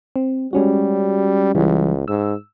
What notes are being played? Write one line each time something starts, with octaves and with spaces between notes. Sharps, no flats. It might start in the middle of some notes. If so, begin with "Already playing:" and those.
C4
G3 G#3 C#4 F#4
C#2 E3 G3
G#2 E6